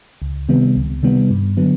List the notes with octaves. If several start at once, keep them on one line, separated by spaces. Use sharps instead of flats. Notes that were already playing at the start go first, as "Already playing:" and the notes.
C#2
C3 D#3 G3 B3
C#2
C3 D#3 G3 B3
G2
D3 F#3 B3